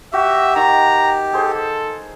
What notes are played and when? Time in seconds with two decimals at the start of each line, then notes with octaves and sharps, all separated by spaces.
0.13 F#4 G4 E5
0.56 D#3 A#5
1.33 G#4 A4 C5